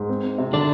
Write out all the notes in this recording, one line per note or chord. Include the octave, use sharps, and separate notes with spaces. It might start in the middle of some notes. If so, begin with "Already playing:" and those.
Already playing: G#2
C4
C4
C3
D3 D4 D5